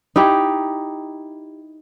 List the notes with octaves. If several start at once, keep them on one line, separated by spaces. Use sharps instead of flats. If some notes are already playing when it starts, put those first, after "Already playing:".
D#4 E4 G4